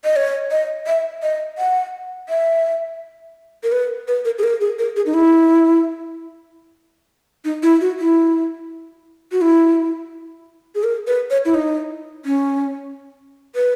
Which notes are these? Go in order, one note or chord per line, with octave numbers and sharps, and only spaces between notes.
D#5
C#5
D#5
E5
D#5
F#5
E5
A#4
B4
B4
A#4
G#4
A#4
G#4
A#4
G#4
D#4
E4
D#4
E4
F#4
E4
F#4
E4
G#4
A#4
B4
C#5
E4
D#4
C#4
B4